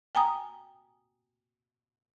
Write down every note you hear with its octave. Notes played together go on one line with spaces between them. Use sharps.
G5 G#5 A#5 D#6